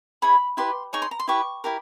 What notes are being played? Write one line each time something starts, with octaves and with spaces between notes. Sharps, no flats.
E4 G#4 C#5 B5
E4 G4 B4 C6
D#4 G#4 C#5 C#6
C6
A#5
C6
E4 G4 B4 C#6
E4 G4 A#4